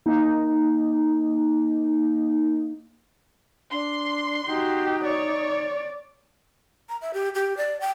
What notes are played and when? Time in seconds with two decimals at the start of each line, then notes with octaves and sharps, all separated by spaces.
0.06 A#3 D#4
3.72 D4 C6
4.47 D#4 F#4 G4
5.04 C#5 D5
6.89 A#5
7.01 E5
7.14 G4
7.35 G4
7.57 D5
7.81 G5